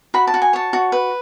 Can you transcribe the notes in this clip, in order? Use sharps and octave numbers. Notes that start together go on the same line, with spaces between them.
F#4 B5
A5
F#4
G#5
C#5 A5
F#4
B4